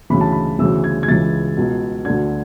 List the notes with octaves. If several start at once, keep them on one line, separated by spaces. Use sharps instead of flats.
D2 C#3 E3 B5
A5
B5
D2 C#3 E3 E6
G#6
G#6
C#2 C#3 E3 A6
C#2 B2
D2 D3 G#6